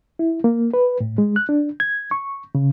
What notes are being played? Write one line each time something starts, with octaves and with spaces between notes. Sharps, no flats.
E4
A#3
B4
A2
G#3
F#6
D4
G#6
C#6
C#3